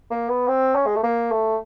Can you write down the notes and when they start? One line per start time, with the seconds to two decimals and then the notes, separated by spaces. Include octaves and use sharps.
0.10 A#3
0.29 B3
0.48 C4
0.75 C#4
0.86 G#3
0.96 A3
1.03 A#3
1.31 A3